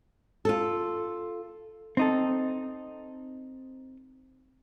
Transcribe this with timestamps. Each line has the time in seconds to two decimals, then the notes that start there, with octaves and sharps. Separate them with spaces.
0.45 F4 A4
1.97 C4 D#4 A4